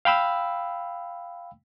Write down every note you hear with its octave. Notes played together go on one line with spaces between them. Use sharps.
F5 G5 B5 E6